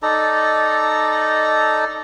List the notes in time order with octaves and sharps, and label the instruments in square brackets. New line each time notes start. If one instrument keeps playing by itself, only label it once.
[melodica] D#4 A4 D5 A#5